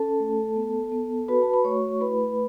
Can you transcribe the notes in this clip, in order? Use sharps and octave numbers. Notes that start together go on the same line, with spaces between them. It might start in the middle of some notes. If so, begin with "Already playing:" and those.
Already playing: C#4 A4 A5
A3
B3
B3
F#4 B4 B5
A5
B5
A3 C#5 C#6
E4 B4 B5